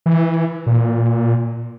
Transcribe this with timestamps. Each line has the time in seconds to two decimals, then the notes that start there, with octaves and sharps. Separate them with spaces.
0.06 E3
0.66 A#2